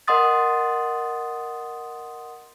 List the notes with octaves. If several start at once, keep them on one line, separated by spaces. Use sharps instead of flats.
A#4 D#5 F#5 C6 D#6 A6